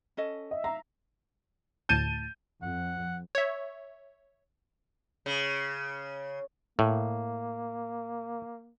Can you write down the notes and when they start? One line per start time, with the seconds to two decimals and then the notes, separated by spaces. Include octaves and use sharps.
0.17 C#4 A4 D#5
0.51 D#5 E5
0.64 F5 A#5
1.89 D2 A2 A5 G6 D#7
2.62 F2 F#5
3.35 C#5 E5
5.26 C#3
6.79 A2 A#3